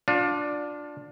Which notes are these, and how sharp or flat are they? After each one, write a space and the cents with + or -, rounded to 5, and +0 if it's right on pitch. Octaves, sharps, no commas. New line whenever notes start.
D4 +0 F4 +30